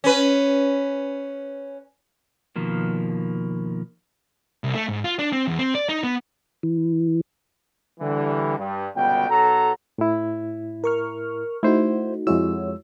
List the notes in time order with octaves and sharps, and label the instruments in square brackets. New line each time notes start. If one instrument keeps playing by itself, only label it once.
[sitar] C#4 B4
[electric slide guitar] B2 D#3 F3 A#3
[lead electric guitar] C2
A3
G#2
F4
D4
C4
E2
C4
D5
D#4
B3
[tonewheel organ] E3
[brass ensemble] D3 E3 G3
G2
G1 C#2 B2 B3 G5
B1 F#3 A4 A#5
[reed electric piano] A2 E4
[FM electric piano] A#4 C#6 F6
[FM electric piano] A3 D#4 F#4 [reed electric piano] E4 C5
[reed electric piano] F2 G#3 E6 [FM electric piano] E4 F#4 C#5